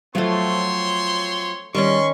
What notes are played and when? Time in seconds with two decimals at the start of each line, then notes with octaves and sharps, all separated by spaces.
0.15 F3 F#3 A3 C4 F4 C#5 F5 C6
1.75 D#3 G3 C#4 D5 C6 C#6